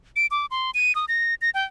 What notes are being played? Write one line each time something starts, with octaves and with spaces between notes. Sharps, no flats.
D7
D6
C6
D#7
D#6
A#6
A#6
G5